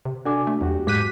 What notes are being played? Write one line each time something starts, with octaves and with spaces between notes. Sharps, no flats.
C3
D4 F#4 A4 D5 G#5 D6
A3
E2 F#3 F#4 G4
G#2 G#3 D6 F#6 G6 B6 D#7